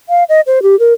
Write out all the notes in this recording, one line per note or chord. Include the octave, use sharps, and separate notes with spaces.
F5
D#5
C5
G4
A#4